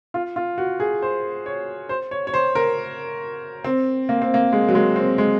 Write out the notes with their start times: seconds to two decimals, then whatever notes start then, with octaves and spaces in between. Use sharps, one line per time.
0.14 F4
0.36 F4
0.58 F#4
0.80 G#4
1.02 C5
1.46 C#5
1.89 C5
2.11 C#5
2.27 C#5
2.34 C5
2.55 A#4
3.64 C4
4.09 A#3
4.22 C4
4.34 A#3
4.52 G#3
4.68 F#3
4.75 G#3
4.96 C4
5.18 G#3